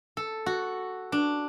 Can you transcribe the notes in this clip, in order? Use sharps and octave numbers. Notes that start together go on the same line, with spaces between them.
A4
F#4
D4